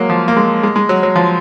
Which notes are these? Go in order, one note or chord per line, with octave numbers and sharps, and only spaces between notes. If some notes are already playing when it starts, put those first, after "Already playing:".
Already playing: F#3 G#3 A#3
F3
A#3
G#3
G#3
G#3
F#3
F#3
F3